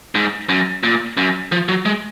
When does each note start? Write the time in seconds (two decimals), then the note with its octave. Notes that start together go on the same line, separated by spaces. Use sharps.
0.15 G#2
0.49 F#2
0.83 A#2
1.17 F#2
1.52 F3
1.68 F#3
1.86 G#3